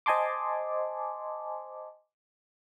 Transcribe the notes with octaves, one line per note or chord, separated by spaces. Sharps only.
C5 D#5 G#5 A5 C6 D6